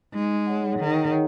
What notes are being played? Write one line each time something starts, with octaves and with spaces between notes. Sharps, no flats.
G#3 D#4
G#4 C#5 F#5
D#3 D#4
G#4 C#5